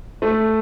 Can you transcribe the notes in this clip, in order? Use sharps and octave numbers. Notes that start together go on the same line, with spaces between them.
A3